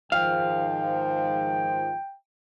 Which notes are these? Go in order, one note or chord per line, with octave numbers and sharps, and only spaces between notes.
G#2 D#3 F3 F5 G5